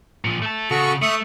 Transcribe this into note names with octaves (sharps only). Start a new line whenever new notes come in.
A#2 F3
A3 A5
C#3 F#4 A4 C#6
A3 E5 C#6 D#6